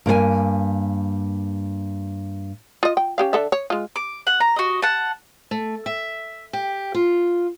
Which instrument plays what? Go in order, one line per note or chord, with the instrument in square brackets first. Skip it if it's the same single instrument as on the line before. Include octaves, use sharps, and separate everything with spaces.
[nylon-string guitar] G2 A#3 A#4 G#5
[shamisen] F4 D#5
G5
C#4 G4 F5
D3 A4 E5
C#5
G#3 F4
[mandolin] D6
F#5
A#5
F#4 D#5
F#5 A5
[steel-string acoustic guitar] A3
E5
G4
F4